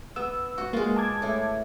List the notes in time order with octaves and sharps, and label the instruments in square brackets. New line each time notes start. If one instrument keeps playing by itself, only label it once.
[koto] B3 [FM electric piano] E6
[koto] F#4
[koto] G#3 F4 [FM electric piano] A#3
[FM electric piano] A5 D6 G#6
[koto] A2 E4